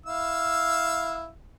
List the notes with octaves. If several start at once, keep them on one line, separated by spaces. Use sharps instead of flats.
E4 F5 E6